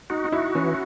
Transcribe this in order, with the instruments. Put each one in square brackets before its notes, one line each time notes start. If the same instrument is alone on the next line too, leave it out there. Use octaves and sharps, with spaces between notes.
[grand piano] D#4 [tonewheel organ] F#4
[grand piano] D#4
[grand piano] E4 [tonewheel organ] F#4
[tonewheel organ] E3 [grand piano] C#4